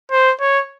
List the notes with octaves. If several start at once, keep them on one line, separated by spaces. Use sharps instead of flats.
C5
C#5